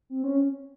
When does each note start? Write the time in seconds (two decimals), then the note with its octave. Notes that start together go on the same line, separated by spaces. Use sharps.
0.10 C4
0.24 C#4